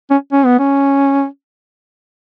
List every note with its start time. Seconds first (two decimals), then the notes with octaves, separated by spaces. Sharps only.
0.11 C#4
0.32 C#4
0.46 B3
0.59 C#4